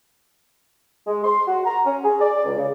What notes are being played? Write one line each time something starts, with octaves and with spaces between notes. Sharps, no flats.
G#3
C6
F#4
A#5
C#4
G#4
D5
C#2
C#3